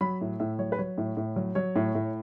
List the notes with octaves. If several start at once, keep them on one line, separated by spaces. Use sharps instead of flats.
F#3 B5
A2
A2 E5
F#3 C#5
B4
F#3 C#5
A2
A2
F#3
F#3 C#5
A2
A2